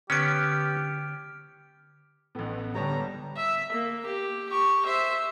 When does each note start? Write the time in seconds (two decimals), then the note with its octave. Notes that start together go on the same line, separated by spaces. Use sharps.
0.10 D3 B3 C#4 G4 F6 D7
2.35 A1 A2 B3
2.75 D3 G3 G4 C#5 A5 A#5
3.36 E5
3.72 A#3
4.06 G4
4.49 G4 C#6
4.86 C5 E5